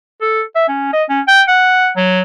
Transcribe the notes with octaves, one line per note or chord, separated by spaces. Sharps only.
A4
E5
C#4
D#5
C#4
G5
F#5
F#3